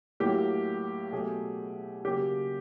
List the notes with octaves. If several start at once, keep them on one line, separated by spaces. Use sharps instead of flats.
A2 F#3 A#3 G4
B2 F#3 A3 G#4
C#3 F#3 A#3 G4